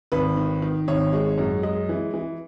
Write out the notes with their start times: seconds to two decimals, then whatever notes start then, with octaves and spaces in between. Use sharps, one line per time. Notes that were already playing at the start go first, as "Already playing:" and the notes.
0.12 G#1 B4
0.37 D#3
0.62 D#3
0.88 G#1 C#5
1.13 G#3
1.38 F#2
1.63 G#3 D#5
1.89 E3
2.14 E3